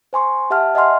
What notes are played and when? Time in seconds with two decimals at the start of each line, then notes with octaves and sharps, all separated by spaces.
0.13 C5 G#5 C6 C#6
0.50 G4 E5 F#5 A5 F6
0.75 D#5 E5 F#5 G#5 C6 F6